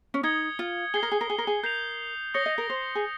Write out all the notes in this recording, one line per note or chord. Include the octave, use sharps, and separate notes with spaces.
C#4
D#4 D#6 G#6 C#7 G7
F4
G#4 G#6 C7 G7
A#4
G#4
A#4
G#4
A#4
G#4
A#4 G6 C7 F7
C#5 D#6 A#6 C#7 G7
D#5
A#4
C5
G#4